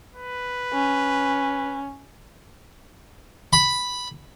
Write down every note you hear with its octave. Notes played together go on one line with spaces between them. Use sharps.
B4
C#4
B5